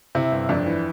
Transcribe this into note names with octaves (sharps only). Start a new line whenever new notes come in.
C3 E4
G1
F2 D4
E3